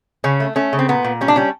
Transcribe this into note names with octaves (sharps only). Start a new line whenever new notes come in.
C#3 C#4
A3
A3 C#4
C#3
C4
A#2 B3
A#2
G3 C#4
D4
G3 C#4